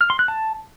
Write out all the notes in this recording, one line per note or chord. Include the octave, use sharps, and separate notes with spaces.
F6
C6
F#6
A5